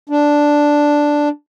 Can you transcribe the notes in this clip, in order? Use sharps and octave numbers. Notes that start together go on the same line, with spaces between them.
D4